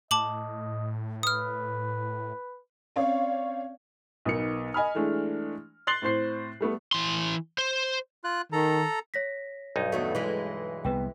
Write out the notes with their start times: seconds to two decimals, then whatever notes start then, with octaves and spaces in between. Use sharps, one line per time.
0.11 A2 D#5 A5 D6 F#7
1.23 B4 D#6 F6
2.96 C4 C#4 C#5 D5 F5
4.25 B1 B3 D#4 A#4 C#7
4.74 D#5 G#5 B5 F6
4.95 E3 G#3 A3 D4
5.87 C6 F#6 A6 C7 F#7 G7
6.02 A2 C4 C5 C7
6.61 G3 A3 B3
6.92 E3 C6
7.58 C5
8.24 F4 F#6
8.52 D#3 A4 A#5
9.14 C#5 A#6 B6
9.76 B1 G2 D#4
9.92 E2 F#3 A3
10.15 E3 G#3
10.85 C2 B3 B4 G5